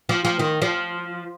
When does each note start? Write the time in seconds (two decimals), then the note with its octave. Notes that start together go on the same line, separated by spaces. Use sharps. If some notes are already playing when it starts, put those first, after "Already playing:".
0.09 F3
0.25 F3
0.39 D#3
0.62 F3